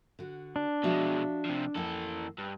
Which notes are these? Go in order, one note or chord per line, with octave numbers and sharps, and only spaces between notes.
D3 F#4
D4
B2 F3 G#3 F#4 E5
C3 F3
F2 E3 A#3 A4
G2